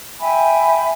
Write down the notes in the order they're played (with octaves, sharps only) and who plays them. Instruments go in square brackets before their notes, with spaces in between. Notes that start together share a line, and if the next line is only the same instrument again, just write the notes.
[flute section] E5 G5 G#5 B5